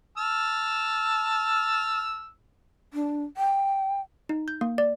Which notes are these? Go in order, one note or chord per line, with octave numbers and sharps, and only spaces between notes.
A5 E6 F6
D4
G5
D#4
G6
A#3
D5